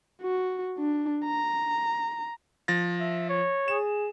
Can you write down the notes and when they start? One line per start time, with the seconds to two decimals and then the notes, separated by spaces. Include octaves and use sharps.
0.22 F#4
0.79 D4
1.25 A#5
2.68 F3 A6 A#6
3.00 E5
3.29 C#5
3.68 G#4 E7